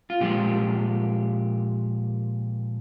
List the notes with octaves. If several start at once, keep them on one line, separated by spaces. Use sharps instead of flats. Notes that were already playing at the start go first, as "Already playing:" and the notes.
F4
A#2 F3 G#3 G4